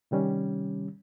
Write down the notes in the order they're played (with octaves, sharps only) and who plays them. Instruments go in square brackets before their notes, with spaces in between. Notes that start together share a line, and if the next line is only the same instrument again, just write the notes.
[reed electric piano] C3 D#3 G3 C#4